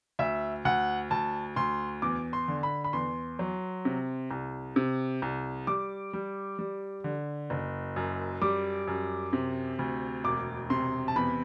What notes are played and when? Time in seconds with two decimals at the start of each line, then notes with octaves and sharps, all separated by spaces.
0.19 D2 E5
0.65 D2 F#5
1.11 D2 A5
1.56 D2 C6
2.02 E2 D6
2.33 C6
2.48 D3
2.63 B5
2.84 B5
2.93 E2 C6
3.39 F#3
3.85 C3
4.31 C2
4.76 C3
5.22 C2
5.67 G3 D6
6.13 G3
6.59 G3
7.04 D3
7.50 F#1
7.96 F#2
8.42 G3 D6
8.88 F#2
9.33 C3
9.79 D2
10.24 E1 D6
10.70 C3 C6
11.08 A5
11.16 E2 B5